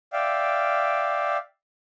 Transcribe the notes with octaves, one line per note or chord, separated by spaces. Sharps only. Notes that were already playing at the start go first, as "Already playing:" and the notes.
D5 E5 F5 G5